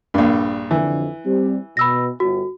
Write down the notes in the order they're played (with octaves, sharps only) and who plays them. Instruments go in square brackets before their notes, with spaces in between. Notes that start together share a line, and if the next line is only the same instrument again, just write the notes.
[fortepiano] A#1 G2
[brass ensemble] F2 D3 [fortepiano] E3
[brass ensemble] G3 C4 G4
[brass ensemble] B2 [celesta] B5 E6 A#6
[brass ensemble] G1 [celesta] F#4